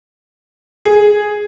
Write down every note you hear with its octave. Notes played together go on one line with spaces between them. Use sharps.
G#4